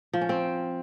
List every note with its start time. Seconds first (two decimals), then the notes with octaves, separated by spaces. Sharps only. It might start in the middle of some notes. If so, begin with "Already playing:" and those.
0.13 F3
0.21 C#4
0.29 C4